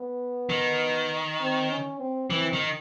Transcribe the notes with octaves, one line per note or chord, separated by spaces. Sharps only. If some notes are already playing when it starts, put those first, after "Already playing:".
Already playing: B3
D#3
C4
C#4
C4
E3 C4
D#3